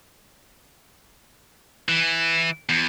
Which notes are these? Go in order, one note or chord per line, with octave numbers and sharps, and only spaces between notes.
E3
E2